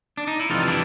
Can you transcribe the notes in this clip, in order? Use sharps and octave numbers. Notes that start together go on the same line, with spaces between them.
D4
D#4
E4
F2 C3 E3 G3 D#4 F4
D4 E4